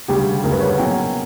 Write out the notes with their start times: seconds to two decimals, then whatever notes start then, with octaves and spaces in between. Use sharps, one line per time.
0.08 D2 C#3 G3 G4
0.43 D2 C#3 G3 A#4
0.52 B4
0.60 C#5
0.69 F#5
0.77 B2 F#3 A#3 C#4 E4 G5